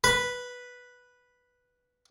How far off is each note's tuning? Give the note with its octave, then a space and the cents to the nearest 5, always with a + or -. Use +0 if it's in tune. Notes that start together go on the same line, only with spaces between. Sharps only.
B4 -5